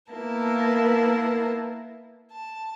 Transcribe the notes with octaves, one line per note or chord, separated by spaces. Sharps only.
A#3 B3 E4 A#4 A5
A5